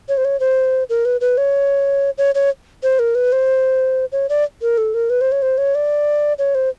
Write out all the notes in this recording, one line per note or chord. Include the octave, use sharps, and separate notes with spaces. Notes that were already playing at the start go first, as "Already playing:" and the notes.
C#5
C5
C#5
C5
A#4
B4
B4
C#5
C#5
C#5
C5
A#4
B4
C5
C#5
D5
A#4
A4
A#4
B4
C5
C#5
C5
C#5
D5
C#5
C5